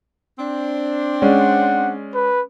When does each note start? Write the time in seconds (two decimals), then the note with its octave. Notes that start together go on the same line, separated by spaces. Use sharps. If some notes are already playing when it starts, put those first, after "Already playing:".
0.38 C4 D4
1.22 G#3 C#4 D5 F#5
2.14 B4